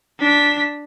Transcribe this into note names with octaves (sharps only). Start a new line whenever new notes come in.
D4 B6